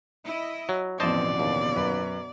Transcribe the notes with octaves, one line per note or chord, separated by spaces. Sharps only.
E4 D#5
F#3
A1 F2 B2 D3 C5 D5 D#5 A5
D#2
F#2 B4